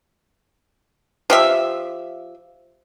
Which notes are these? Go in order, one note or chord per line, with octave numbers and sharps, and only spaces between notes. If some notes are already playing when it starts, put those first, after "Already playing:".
F3 G4 E5